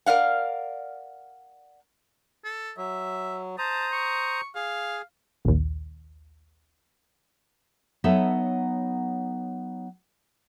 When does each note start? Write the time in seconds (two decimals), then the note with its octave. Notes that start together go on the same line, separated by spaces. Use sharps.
0.06 A#4 D5 F5 F#5
2.44 A4
2.77 F#3 E5
3.58 C5 A5 A#5 D#6
3.92 C#6
4.55 G#4 F5
5.45 A#1 D#2
8.04 F#3 B3 D#4 A4 C#5 E5